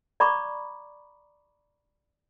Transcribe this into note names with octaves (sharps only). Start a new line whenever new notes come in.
D5 A#5 B5 C#6 D6